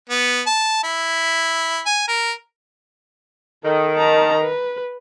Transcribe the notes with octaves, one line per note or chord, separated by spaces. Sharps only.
B3
A5
E4
G#5
A#4
D#3 A4
A5 A#5
B4